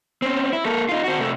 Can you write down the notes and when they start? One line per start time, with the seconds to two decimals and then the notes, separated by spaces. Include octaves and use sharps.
0.22 C4 C#4
0.53 E4
0.65 A#3 A4
0.89 D#4 F4
1.04 C4 F#4
1.18 C3 A3